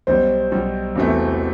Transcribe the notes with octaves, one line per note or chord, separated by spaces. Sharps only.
B1 B2 G3 C5
B1 B2 G3
E1 E2 C3 E3 A3